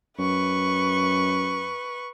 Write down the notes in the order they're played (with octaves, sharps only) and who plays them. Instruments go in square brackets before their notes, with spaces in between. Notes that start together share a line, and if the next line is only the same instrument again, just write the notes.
[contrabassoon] F#2 [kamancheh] B4 C#6